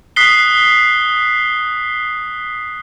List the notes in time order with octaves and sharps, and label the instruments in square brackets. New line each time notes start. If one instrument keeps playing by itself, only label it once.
[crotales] D#6 F#6 B6 C7 G7